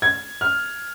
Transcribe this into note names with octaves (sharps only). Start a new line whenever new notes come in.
G#6
F6